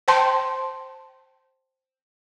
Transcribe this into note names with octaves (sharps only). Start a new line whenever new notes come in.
C5 G5 A5 C6